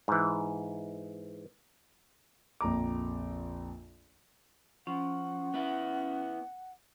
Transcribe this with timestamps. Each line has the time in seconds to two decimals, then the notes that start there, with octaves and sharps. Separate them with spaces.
0.08 G#2 E3
2.61 A#1 F2 A#5 D6
4.87 F3 C#4 F#5
5.54 B3 E4